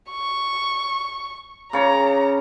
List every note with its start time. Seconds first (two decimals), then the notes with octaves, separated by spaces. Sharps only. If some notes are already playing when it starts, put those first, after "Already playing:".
0.11 C#6
1.73 C#3 C#5 A#5 D6